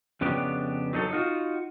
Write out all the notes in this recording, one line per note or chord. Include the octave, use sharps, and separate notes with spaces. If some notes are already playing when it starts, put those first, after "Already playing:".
F2 C#3 B3 D4 G4
F#3 D#4 G#4 A4
D#4 F4 F#4